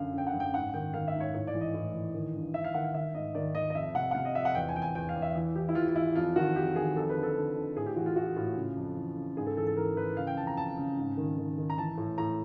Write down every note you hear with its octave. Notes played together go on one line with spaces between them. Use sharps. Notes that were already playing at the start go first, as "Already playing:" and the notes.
Already playing: F#2 D3 F5
D3 G5
F#5
F#2
G5
G#2 F#5
D#3 G5
D#3 F5
E5
G#2
C#5
A2 C#5
D5
E3
D#5
A2
E3
D#3
G2
G2 E5
F5
D#3 F#5
F5
D#3 E5
G#2 D#5
D#3 D5
D#3 D#5
D#5
F2 E5
C3 F#5
F#5
C3 F5
D#5
F2 E5
F#5
E2 G5
G#5
E2 G5
G#5
E2 G5
F5
E2
E5
E3
E3 G4
E4
E3 F4
F4
E3 E4
F2 F4
D#3 F#4
F2 G4
D#3 G#4
F2 A4
B4
D3
A4
D3
D3
A2 G#4
G4
E3 F#4
F4
E3 F#4
A2 F4
C#3
F2
E3
C#3
G#2 G#4
A4
E3 A4
A4
E3 A#4
E3 B4
C#3 F5
G5
F2 A5
A#5
F2 A5
C#3
G#2
D#3
D#3
D#3
A#5
E3 A5
A2
A2 A#5